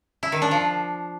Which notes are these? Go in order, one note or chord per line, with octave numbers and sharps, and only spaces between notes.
E4
D#3
D4
F3